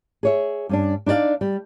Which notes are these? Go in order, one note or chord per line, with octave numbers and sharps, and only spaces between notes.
G#4 C#5 E5
G2 C#4 D4
D4 D#4 C5 D5 F5
G3